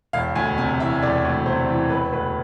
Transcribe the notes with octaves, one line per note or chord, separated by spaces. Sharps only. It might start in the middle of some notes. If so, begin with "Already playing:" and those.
E1 F5
D2 G#5
C3 G#5
E3 E5
E1 D5
D2
C3 C5
E3
E1 B4
D2 B4